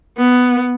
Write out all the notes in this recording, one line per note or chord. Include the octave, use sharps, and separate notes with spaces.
B3